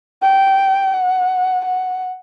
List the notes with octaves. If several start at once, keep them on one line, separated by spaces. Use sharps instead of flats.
G5
F#5
F#5